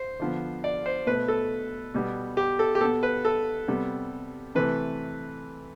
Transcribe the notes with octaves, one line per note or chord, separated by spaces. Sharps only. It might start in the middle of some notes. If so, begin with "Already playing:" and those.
Already playing: C5
D3 F3 B3
D5
C5
B2 A3 B4
A4
B2 G3 B3
G4
A4
G4
B2 B3 A4
B4
A4
C3 G3 B3
C3 E3 A3 B4